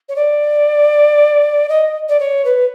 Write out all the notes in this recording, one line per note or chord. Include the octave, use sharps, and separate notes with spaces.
C#5
D5
D#5
D5
C#5
B4